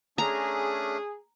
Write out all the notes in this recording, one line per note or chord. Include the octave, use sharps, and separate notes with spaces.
A3 C#4 D4 G#4 A#5